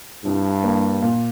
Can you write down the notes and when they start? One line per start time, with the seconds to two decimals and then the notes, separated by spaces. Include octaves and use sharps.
0.25 C2 G2
0.64 A#3
1.02 A#2